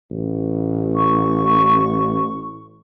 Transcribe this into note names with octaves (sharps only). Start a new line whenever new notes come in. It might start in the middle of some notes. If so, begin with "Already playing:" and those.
A1
C#6